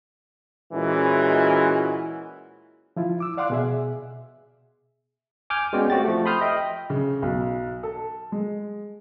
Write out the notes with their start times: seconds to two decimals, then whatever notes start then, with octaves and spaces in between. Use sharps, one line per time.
0.73 A#2 E3 G#3 C#4 E4 F#4
2.96 F3 E4 F4
3.20 D6 E6
3.37 D5 F5 F#5 C6 D6 F#6
3.50 B2 G#4 E5
5.50 G#5 D6 F6 G6
5.73 G#3 B3 C#4 F#4 D5 G5
5.90 A3 C4 F#4 G4 A6
6.04 F3 A3
6.26 B5 C6 D#6 F6 G6
6.41 D#5 E5 G5
6.90 C#3
7.22 B1
7.83 A4
8.32 G#3